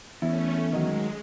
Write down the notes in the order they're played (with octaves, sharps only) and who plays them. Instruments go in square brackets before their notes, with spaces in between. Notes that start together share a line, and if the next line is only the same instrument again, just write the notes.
[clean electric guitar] E2 [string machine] A3 C#4 [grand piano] E4
[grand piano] D#3 F#3 [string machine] G#3